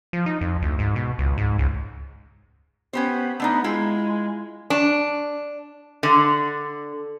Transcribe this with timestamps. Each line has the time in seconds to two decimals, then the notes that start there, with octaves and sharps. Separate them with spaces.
0.13 F3
0.26 D#4
0.41 F2
0.62 D2
0.79 G#2
0.96 B2
1.19 C#2
1.38 G#2
1.58 C#2
2.93 B3 C#4 G4 C5
3.40 A3 B3 D4 D#4
3.64 G#3 E4 F4
4.70 D4
6.03 D3